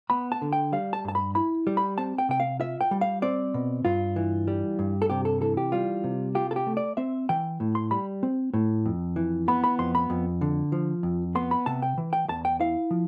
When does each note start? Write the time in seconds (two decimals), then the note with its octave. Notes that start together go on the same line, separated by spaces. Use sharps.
0.10 B3 B5
0.32 A5
0.42 D3
0.53 G5
0.72 G3 F5
0.93 A5
1.05 G2 A5
1.15 B5
1.35 E4 B5
1.67 G3
1.77 B5
1.98 C4 A5
2.18 G5
2.29 C3 G5
2.40 F5
2.60 F4 E5
2.81 G5
2.91 G3
3.01 F5
3.22 C4 D5
3.54 B2
3.85 G2 F4
4.16 E3
4.48 G3
4.79 G2
5.02 A4
5.10 C3 G4
5.25 A4
5.41 E3 A4
5.57 G4
5.72 G3 F4
6.04 C3
6.35 F4 G4
6.51 A4
6.56 G4
6.67 A3
6.77 D5
6.97 C4 E5
7.29 E3 G5
7.60 A2
7.75 C6
7.91 G3 B5
8.23 C4
8.54 A2
8.86 F2
9.16 E3
9.48 B3 B5
9.64 B5
9.79 F2 C6
9.95 B5
10.10 F2
10.41 D3
10.72 F3
11.03 F2
11.35 B3 C6
11.51 B5
11.66 C3 A5
11.82 G5
11.98 E3
12.13 G5
12.29 E2 A5
12.45 G5
12.60 E4 F5
12.91 F3